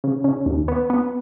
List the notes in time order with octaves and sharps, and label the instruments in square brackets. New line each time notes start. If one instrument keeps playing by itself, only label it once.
[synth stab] C#3
C#3
D#2
B3
B3